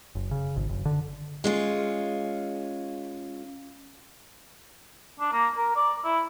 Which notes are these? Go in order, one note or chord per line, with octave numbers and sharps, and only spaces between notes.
F#1
C#3
G#1
F#1
D3
G#3 C#4 F4
D4
A#3
A#4
D5
E4